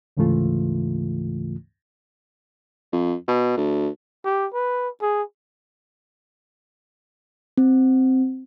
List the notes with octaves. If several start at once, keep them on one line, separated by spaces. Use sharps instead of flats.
D2 G#2 C#3 E3 A3 F4
F2
B2
D2
G4
B4
G#4
C4